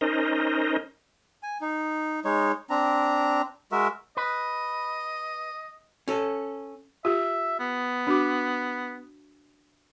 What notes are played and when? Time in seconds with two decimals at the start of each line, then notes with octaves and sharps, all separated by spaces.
0.01 C#4 D#4 A#4 C5 D#5
1.43 G#5
1.61 D#4
2.25 G#3 D#4 C#5
2.70 C4 D4 A#5
3.72 G#3 F#4 A#4 E5
4.17 B4 D#5
6.08 C#4 A4
7.05 F4 G4 E5
7.60 B3
8.07 D4 F#4 D6